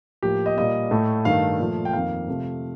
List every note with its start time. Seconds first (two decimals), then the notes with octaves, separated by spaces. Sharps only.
0.23 A2 F3 A#3 G4
0.46 D#5
0.57 A#2 G3 A#3 D#5
0.91 A2 A3
1.25 G2 D#3 A3 F5
1.59 A#2 F3 A3
1.85 G5
1.93 F2 D#3 A#3 F5
2.28 C3 F3 A3